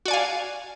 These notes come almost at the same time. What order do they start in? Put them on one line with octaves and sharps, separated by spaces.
F#4 D5 G#5 F5